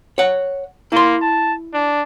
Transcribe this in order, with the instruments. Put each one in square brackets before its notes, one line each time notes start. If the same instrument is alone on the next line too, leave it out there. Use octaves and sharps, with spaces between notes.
[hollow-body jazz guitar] C#5 F#5
[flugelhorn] A#3 [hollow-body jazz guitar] E4 C6
[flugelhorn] A5
D4